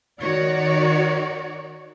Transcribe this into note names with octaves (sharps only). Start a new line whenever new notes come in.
D#3 F#4 C#5 D5